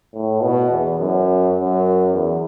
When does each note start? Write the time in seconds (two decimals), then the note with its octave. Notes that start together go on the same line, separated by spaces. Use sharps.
0.14 A2
0.42 B2
0.70 E2
0.99 F#2
1.56 F#2
2.13 E2